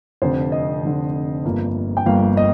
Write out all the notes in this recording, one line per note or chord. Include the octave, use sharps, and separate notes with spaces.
F1 F2 D3 C5
D#5
F1 F2 D3
G1 G2 F3 A#3
G5
G1 G2 F3 A#3 F5
D#5